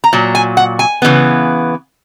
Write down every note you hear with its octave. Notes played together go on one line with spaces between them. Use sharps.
A#5
A#2 F#3
G#5
F#5
G#5
C#3 E3 B3